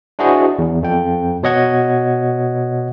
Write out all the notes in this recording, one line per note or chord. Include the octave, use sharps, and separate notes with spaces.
D4 E4 F#4 G#4 C5 D#5
E2
F2 G5
B2 C#5 D#5 F#5 G#6